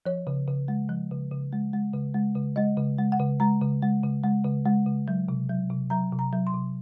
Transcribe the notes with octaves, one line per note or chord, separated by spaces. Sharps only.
F3 C#5
C#3
C#3
G#3
F3
C#3
C#3
G#3
G#3
C#3
G#3
C#3
G#3 D#5
C#3
G#3
F#5
C#3
G#3 A#5
C#3
G#3
C#3
G#3
C#3
G#3
C#3
F#3
C3
F#3
C3
F#3 A#5
C3
A#5
F#3
C6
C3